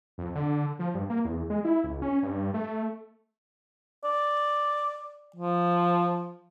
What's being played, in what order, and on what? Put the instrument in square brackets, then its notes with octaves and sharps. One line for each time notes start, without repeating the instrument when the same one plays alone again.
[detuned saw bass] F2
D3
F3
G2
A#3
E2
G#3
E4
C#2
C#4
G2
A3
[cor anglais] D5
F3